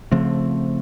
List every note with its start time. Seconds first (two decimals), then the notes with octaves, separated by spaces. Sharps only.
0.12 C#3 F3 A3 C4